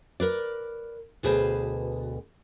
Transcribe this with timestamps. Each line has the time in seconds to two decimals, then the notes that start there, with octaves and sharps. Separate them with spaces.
0.20 A#4 B4 D5
1.23 D2 B2 G#4 B4 C5